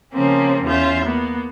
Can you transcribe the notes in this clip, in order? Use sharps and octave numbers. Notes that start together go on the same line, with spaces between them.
C#3 F3 A#3 C4 C#4
E2 C#4 F4 E5 G6
A#3 B3